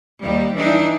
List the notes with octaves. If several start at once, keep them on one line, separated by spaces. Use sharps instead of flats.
D#2 G3
E3 D4 D#4